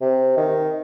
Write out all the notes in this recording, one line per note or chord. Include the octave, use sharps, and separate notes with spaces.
C3
D#3